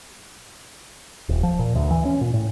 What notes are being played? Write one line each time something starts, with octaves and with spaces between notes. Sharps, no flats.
D#1
F3
A#2
D2
E3
C#4
A#2
A2